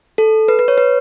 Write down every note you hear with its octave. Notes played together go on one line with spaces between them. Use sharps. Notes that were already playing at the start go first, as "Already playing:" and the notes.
A4
B4
B4
C#5
B4